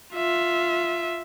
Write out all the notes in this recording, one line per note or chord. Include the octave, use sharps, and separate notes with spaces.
F4 E5